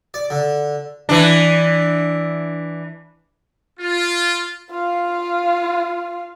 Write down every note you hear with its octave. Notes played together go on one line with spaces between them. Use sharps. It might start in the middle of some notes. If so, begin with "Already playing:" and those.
D5
D3
E3 D4
F4
F4 F5